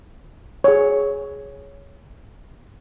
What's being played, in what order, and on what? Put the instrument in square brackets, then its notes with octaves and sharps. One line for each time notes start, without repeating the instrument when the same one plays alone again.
[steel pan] G#4 C#5